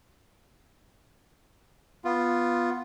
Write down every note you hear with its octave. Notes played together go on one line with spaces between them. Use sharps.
B3 F4